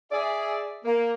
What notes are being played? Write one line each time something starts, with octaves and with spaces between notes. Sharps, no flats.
G#4 D5 E5
A#3